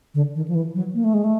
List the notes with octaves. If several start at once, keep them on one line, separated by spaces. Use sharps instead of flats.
D3
D#3
F3
E3
F#3
A#3
A3
G#3
A3